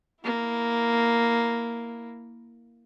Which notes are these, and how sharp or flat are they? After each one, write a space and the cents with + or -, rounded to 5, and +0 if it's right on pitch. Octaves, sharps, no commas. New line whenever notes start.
A#3 +0 E4 +0